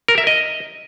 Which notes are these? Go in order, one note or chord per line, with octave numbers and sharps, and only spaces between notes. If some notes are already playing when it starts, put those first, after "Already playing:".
A#4
E5
D#5